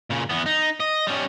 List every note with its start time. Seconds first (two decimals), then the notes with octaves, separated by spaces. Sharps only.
0.10 A#2 C#3
0.30 E2 B3
0.46 D#4
0.80 D#5
1.07 G3 C#4